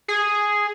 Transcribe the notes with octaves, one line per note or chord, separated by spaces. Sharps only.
G#4